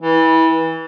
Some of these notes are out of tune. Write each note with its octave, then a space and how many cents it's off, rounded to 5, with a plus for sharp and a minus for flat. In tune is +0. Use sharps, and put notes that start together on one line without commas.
E3 -20